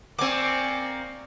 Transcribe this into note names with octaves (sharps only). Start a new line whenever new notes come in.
A#3 C4 D5 G#5 C#6 D6